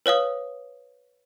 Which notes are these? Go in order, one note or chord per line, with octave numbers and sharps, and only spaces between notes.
B4 C#5 F5 D#6